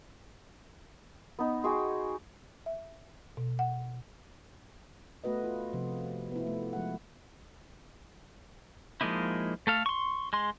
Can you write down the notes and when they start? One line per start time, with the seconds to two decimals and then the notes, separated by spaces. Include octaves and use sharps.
1.39 B3 D#4
1.64 F#4 G#4 G5 C6
2.66 E5
3.37 B2
3.59 F#5
5.24 A3 B3 F#4 B4 D#5
5.44 F4
5.73 C3 F3
6.31 B3 E4
6.47 A3
6.73 F3 G#3 F#5
9.01 F3 G#3 A#3 D#4 E4
9.67 A3 A4 F5
9.86 C6 C#6
10.33 G#3 C6